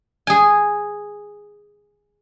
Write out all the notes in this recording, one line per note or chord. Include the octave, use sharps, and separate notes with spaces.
G#4 G#5